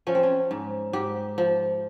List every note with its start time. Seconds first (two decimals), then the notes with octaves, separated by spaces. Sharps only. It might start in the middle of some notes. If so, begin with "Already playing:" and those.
0.07 F3 C#4
0.15 C4
0.23 C#4
0.51 G#2
0.93 G#2 G4
1.38 F3